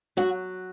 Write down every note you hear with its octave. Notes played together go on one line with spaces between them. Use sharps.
F#3 F#4